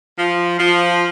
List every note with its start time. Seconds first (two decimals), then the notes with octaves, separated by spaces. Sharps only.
0.18 F3
0.59 F3